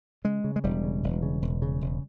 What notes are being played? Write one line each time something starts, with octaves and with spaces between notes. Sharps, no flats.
C#3 G#3
C#3
G#3
E1 G3
C#3
E1
C#3
E1
C#3
E1